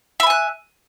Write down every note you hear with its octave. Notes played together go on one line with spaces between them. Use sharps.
E5 G#5 B5 F#6